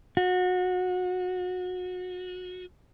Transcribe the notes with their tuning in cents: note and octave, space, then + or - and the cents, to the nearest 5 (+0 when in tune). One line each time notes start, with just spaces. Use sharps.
F#4 -25